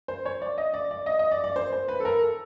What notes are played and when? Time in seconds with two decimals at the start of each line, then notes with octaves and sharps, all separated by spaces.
0.08 C5
0.25 C#5
0.42 D5
0.58 D#5
0.74 D5
0.91 D5
1.06 D#5
1.19 D#5
1.32 D5
1.44 D5
1.56 C5
1.73 C5
1.88 B4
2.00 A4
2.05 A#4
2.21 A4